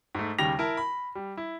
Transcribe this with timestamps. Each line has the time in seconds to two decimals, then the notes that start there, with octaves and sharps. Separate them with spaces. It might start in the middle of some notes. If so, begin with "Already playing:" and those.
0.15 G#2 A3
0.38 D#2 C#3 G3 G5 A#6 F7
0.59 E4 A#4 A5
0.77 B5
1.15 G3
1.37 E4